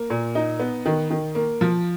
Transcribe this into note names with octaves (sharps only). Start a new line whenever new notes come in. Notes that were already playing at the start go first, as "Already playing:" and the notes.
Already playing: A#3
A#2
D#4
B3
D#3
D#3
A#3
F3